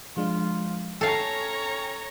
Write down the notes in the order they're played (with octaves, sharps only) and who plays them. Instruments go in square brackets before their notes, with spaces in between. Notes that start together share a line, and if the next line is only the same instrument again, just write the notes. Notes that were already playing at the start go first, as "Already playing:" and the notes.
[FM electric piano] F3 G#3 D4 [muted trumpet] F4
[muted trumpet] C#4 [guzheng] A4 F5 [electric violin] C#5 A#5 [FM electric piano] G5